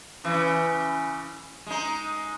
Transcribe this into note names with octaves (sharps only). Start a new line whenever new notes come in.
C#3 E3
G#3 D#4